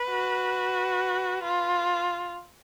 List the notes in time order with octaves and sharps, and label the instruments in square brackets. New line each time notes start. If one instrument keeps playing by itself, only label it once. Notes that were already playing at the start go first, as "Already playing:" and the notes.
Already playing: [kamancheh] B4
[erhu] F#4
F4